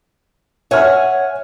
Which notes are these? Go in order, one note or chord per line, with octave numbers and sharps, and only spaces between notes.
C#5 E5 F#5 G#5 F6